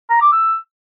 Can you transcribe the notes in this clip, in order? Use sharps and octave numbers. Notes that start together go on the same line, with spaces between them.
A#5
D6
E6